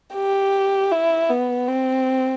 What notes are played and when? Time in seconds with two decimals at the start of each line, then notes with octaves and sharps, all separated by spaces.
0.15 G4
0.92 E4
1.30 B3
1.68 C4